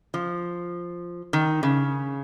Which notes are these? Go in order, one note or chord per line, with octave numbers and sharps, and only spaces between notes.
F3
D#3
C#3